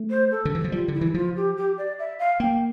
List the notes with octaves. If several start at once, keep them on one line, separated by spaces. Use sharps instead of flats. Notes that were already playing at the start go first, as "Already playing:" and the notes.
Already playing: A3
C5
A4
D3
E3
F3
G3 F4
D3
E4
E3
F3 F4
G4
G4
D5
E5
F5
A#3 G5